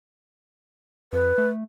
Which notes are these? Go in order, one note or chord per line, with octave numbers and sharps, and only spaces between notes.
F2 B4
A3